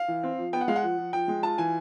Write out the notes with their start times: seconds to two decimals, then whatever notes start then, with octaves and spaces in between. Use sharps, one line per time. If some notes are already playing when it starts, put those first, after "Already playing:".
Already playing: F5
0.08 E3
0.23 C4
0.38 F3
0.53 B3 G5
0.61 F#5
0.68 G#3 F5
0.76 F#5
0.83 F3
0.98 F3
1.13 F3 G5
1.28 G#3
1.43 F4 A5
1.58 E3 G#5